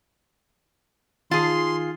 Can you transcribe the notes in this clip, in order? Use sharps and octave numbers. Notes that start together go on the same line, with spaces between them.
D#3 F4 G#4 C6